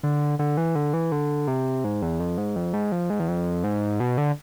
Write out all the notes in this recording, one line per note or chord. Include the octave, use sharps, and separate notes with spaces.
D3
D3
E3
D3
E3
D3
C3
G#2
E2
F2
G#2
F2
G#2
F2
G#2
E2
F2
G#2
B2
D3